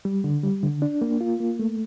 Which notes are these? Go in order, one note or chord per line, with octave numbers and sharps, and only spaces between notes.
G3
D3
G3
D3
D4
A#3
F4
A#3
A3